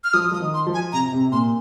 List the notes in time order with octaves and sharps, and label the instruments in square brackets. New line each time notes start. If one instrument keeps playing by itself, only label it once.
[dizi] F6
[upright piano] F3 [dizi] D#6
[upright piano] F3 [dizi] D#6
[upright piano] D#3
[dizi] C6
[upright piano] F3
[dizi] G#5
[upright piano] C3 [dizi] A#5
[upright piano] C3
[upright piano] A#2 [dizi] C6